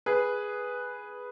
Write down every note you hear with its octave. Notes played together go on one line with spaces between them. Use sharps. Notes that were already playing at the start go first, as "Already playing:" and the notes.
G#4 B4